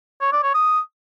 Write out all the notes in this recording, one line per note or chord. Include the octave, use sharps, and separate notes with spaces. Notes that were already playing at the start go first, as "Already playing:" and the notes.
C#5
D5
C#5
D#6